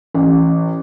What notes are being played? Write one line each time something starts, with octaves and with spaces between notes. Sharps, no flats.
A1